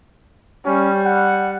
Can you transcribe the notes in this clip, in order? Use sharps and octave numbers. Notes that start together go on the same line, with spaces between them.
G3 C#4
F#5